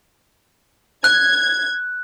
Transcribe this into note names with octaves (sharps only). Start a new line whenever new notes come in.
F#6 G#6